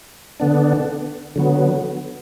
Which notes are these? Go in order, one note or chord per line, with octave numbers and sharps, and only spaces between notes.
D3 B3 D4
D3 F#3 B3